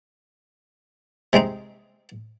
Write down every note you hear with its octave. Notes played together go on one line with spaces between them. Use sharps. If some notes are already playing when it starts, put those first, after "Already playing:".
C3 G#3 C4 D#4